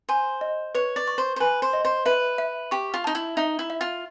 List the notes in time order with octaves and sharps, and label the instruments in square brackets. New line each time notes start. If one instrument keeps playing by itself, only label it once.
[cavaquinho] C5 [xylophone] G#5
[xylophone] D#5
[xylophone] B4 [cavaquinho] C#5
[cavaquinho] D5
[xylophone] C#6
[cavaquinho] C5
C5
[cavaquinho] B4 [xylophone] G#5
[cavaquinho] C5
[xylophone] D#5
[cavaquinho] C5
[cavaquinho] B4 [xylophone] E5
[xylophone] E5
[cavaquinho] G4 [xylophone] C#6
[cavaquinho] F4
[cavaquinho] D#4 [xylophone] A5
[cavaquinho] E4
[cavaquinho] D#4 [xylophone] E5
[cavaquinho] E4
[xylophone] E5
[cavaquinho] F4